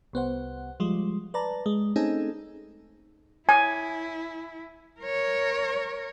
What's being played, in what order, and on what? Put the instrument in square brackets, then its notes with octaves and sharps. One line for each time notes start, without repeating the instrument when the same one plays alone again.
[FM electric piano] C2 B3 C5 F#5
F3 G3 G#3 F4
B4 D5 A5 A#5
G#3
A3 C4 C#4 D#4 G#4 A4
[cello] E4 [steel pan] G#5
[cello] A#4 C#5